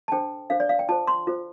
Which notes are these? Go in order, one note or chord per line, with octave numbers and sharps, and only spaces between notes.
A5
D4 A4 C5 G5
D4 A4 C5 F5
D5
F5
G5
F4 A4 C5 A5
C6
F4 A4 C5